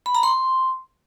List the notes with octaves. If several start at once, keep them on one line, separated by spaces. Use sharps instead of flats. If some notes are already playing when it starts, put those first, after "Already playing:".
B5
A#5
C6